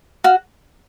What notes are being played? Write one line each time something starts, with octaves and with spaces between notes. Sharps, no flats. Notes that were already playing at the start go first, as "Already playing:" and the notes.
F#4 F5